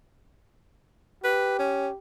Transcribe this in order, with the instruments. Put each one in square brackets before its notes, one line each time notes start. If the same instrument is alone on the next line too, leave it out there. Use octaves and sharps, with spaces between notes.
[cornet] G4 [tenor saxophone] B4
[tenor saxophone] C#4